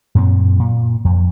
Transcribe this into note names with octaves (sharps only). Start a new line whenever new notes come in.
F#2 A#2 B3 C4
A#2
F2